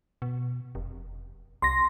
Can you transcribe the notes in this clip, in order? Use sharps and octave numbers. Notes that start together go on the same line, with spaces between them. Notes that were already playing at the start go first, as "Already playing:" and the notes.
B2
F1
C2 C6 A#6